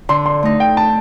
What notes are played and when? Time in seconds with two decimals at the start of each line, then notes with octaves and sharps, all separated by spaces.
0.09 D3 C6
0.26 C6
0.43 A3 D#4
0.60 G5
0.77 A5